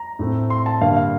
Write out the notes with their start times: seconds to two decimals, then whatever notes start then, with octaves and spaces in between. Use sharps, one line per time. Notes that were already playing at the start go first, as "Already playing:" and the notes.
Already playing: A#5
0.19 A2 A3 C4
0.50 C6
0.66 A5
0.81 G2 D3 G3 A#3 F5
0.97 F5